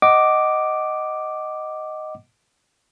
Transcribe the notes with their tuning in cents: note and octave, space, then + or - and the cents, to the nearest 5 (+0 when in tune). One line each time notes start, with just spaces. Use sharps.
D#5 +0 F#5 +20 D6 +0